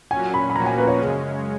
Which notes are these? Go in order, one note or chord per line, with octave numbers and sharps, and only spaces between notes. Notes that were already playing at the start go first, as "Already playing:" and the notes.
A#2 F#3 C#4 G#5
B5
B5
A#2 F3 A#3 C#4 F#4 A#5
G#5
B4
C#5
F#2 C#3 G#3 C#4